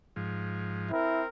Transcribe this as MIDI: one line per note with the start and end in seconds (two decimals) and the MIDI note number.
0.16 0.92 44
0.16 0.92 53
0.91 1.27 60
0.91 1.23 64
0.91 1.27 70